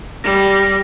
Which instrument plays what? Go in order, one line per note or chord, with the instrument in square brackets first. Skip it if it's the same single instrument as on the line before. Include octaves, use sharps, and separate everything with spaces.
[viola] G3 [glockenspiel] A#6
[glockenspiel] A#6